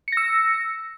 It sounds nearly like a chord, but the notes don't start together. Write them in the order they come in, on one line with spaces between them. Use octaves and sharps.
C#7 A#6 E6